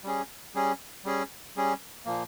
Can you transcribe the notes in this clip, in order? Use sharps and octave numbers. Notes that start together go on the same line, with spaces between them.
G3 C#4 G#4
G3 C#4 G#4
G3 C#4 G#4
G3 C#4 G#4
A#2 F3 A#3